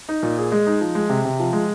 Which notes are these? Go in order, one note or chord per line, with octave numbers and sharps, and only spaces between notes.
D#4
A#2
G#4
G#3
D#4
F3
G#3
C3
C3
F3
G#3